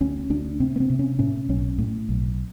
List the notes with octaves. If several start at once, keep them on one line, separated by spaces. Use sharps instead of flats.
D2 C#4
D2 D4
C3 C4
B3
C4
C3
C#4
A2 C#4
B1 C#4
A2
B1